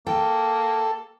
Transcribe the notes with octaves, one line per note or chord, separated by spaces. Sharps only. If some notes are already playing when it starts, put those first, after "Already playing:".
A#3 A4 G5